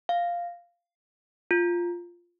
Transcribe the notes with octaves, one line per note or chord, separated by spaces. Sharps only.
F5
F4